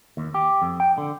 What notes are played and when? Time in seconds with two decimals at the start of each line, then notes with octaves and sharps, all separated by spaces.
0.17 D#2
0.34 G4
0.62 F2
0.80 G5
0.98 D3